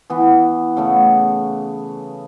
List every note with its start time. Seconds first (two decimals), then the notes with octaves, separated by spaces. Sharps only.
0.10 E3 B3
0.77 C#3 A3 B3